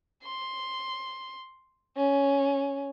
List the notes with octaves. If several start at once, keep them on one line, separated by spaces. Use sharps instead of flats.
C6
C#4